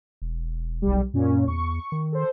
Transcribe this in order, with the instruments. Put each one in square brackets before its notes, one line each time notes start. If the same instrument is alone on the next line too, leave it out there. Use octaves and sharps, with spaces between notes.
[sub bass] E1
[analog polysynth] B1 G3
[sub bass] F#2 [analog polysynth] A#2 C#4
[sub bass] E2 [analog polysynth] C#6
[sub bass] D#3
[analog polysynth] A4 C5